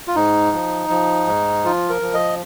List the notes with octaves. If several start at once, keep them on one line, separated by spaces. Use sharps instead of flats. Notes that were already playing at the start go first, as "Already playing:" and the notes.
F4
G#2 D#4
F3
F3
G#2
F3 F4
A#4
F3
D#5